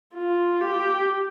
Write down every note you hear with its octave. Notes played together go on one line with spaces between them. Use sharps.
F4
G4